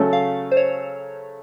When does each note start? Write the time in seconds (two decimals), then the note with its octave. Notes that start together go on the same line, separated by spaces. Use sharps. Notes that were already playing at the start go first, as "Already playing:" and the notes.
Already playing: C#3 F#3 A3 C#4 A4
0.13 F5
0.51 C5
0.57 C#5